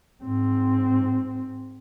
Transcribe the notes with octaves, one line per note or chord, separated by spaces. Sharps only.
G#2 C4